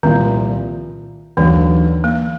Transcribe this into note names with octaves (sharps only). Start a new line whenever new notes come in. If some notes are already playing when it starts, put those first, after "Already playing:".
C2 A#2 D#3 F3
D#2 D3 E3 F#3
A#3